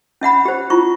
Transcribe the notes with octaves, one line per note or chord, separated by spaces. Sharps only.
C#4 E5 F#5 B5
G4 C5
E4 F4 C#6